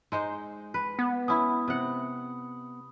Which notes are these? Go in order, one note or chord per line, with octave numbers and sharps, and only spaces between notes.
G#3 D#4 C5
B4
B3
C#4 E4 B5 D#6
C3 F#5